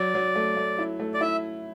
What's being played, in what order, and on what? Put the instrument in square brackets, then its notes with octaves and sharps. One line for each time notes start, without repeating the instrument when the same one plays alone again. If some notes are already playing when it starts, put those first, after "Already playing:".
Already playing: [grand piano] F#3 [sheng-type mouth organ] D5
[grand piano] F#3
A3
A3
E4
A3
[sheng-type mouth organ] D5
[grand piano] E4 [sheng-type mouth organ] E5